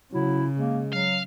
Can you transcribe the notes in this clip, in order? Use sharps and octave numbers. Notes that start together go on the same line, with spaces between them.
C#3 F#3 E4
G#3 A#3
F#3 F5